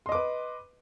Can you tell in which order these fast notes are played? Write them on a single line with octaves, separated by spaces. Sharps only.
C6 D#5 D6 B4